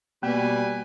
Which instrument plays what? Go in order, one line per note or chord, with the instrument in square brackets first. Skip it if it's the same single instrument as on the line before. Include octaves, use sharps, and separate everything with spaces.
[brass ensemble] B2 [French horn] G3 [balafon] A#3 B3 [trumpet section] G4 B4 G#5